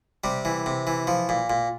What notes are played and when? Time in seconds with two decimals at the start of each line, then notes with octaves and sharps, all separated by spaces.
0.24 C3 G3
0.45 E3
0.66 C3
0.87 E3
1.07 F3
1.29 A#2
1.50 A#2